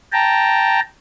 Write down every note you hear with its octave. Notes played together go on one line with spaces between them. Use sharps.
G5 A5 A#5